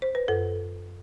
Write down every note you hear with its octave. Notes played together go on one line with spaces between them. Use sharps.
C5
B4
F#2 A4